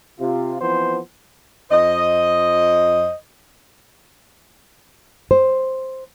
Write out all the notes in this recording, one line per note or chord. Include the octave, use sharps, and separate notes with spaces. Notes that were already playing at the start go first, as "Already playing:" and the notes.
C3 F4
E3 F3 B3 C4 C5
F2 C5 D#5
C5